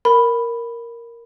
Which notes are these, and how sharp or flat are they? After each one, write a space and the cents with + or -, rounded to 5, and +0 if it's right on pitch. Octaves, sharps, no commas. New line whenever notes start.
A#4 +0 B5 +0